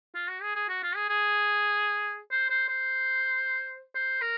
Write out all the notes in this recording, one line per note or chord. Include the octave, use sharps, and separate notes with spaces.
F4
F#4
G#4
G#4
F#4
F4
G#4
G#4
C5
C5
C5
C5
A#4